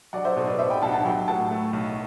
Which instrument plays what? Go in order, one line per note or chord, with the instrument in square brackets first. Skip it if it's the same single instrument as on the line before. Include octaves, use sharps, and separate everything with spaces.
[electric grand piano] F#3 [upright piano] D5 F#5
[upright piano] C5 E5
[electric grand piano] B2 [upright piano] A4 C5
[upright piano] B4 D5
[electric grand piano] B3 [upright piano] C5 E5
[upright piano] G5 B5
[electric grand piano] B1 [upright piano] F#5 A5
[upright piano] F#5 A5
[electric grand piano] F#3 [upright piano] G5 B5
[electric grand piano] A2 [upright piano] F#5 A5
[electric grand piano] A3
B1